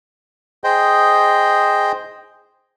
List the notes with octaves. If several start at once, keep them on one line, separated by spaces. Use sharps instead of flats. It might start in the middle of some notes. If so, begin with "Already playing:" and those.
G#4 C5 D#5 G5